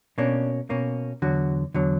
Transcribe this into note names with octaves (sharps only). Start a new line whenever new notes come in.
B2 A#3 C#4 D4
B2 A#3 C#4
E2 D3 F#3 F#4
E2 D3 F#3